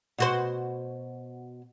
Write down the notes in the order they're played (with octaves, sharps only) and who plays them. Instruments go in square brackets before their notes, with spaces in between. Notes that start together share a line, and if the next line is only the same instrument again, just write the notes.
[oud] B2 F#4 C5